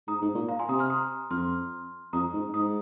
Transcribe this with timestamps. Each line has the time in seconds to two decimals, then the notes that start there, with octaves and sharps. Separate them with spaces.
0.07 G#2 A#5 D#6
0.21 G#2
0.35 A#2
0.49 F5 A#5
0.59 G#5 C6
0.69 C3 A#5 D#6
0.79 C6 F6
0.90 A#5 D#6
1.30 F2 C6 F6
2.13 F2 A#5 D#6
2.33 G#2
2.54 G#2 A#5 D#6